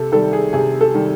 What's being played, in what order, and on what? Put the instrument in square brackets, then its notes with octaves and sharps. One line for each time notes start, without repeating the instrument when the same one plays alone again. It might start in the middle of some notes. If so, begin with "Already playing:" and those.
Already playing: [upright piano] C3 A4
D#3 G3 A4
G#4
C3 G#4
A4
D#3 G3